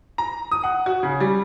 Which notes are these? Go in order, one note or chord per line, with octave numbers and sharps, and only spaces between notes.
A#5
D#6
F#5
F#4
C#3
G3